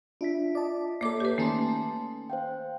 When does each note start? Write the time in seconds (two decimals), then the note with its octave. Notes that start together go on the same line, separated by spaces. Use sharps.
0.21 D4 F4 E5 B6
0.55 F4 D5 D#5 A5
1.01 A#3 A4 C#5 D5 E5 D6
1.20 G4 B4
1.38 D#3 A3 A#3 C#4 G#5 A5 C6
2.30 C5 F5 G5